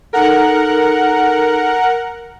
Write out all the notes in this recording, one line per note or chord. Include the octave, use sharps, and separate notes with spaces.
D#4 A4 A#4 F#5